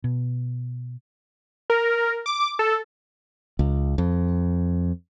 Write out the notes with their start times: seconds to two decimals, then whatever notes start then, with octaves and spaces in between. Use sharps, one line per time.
0.04 B2
1.70 A#4
2.26 D6
2.59 A4
3.59 C#2
3.98 F2